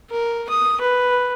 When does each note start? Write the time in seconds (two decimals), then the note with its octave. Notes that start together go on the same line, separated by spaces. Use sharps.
0.11 A#4
0.49 D#6
0.81 B4